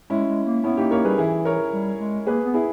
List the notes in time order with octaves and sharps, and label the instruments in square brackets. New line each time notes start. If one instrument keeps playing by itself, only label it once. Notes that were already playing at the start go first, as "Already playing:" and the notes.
[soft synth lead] G#3 [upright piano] C#4 E4
[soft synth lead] G#3
A#3
[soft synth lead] B3 [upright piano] C#4 E4
[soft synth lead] A#3 [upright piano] D#4 G4
[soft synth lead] A#3 [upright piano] A#4 C#5
[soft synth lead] G3 [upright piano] G#4 B4
[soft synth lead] E3 [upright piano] E4 G#4
[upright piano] A#4 C#5
[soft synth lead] G3
G#3
[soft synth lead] A#3 [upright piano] G#4 B4
[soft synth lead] B3
[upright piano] E4 G#4